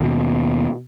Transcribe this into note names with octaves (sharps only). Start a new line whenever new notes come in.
D#2 B2